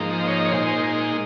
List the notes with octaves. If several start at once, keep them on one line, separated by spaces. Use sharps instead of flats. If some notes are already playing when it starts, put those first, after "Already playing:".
Already playing: G#2 F3 A#3 D#4
C5
C#5
D#5
C#5
A#2 G#3 D#4 C5
C5